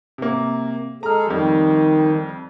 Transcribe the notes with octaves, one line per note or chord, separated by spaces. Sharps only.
C3 A#3
G#3 G#4 A4 A#5 F6
F2 D#3 G3